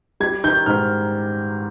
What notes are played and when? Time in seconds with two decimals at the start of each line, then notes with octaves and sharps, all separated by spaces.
0.20 G3 G#6
0.44 D#3 G6
0.66 G#2 F6